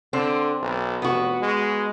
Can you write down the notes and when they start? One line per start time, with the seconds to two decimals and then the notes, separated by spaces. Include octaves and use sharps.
0.13 D3 C4
0.62 B1
1.02 F1 B3 F#4
1.41 G#3